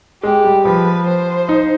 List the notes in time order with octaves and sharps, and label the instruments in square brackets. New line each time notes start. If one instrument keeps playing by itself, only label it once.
[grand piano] G#3 [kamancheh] G4
[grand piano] G3
[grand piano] F3 [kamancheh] B4
[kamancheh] C5
[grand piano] D#4